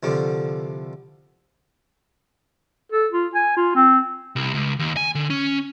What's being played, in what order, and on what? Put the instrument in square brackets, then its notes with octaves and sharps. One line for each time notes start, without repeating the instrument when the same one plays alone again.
[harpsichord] C2 D3 F3
[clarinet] A4
F4
G#5
F4
C4
[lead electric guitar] C2
C#2
D#2
G#5
D3
C#4